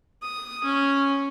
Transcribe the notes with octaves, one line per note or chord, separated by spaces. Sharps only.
D#6
C#4